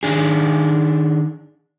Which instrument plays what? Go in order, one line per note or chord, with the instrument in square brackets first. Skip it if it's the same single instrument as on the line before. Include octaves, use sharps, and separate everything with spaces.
[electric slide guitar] D#3 D4 G#4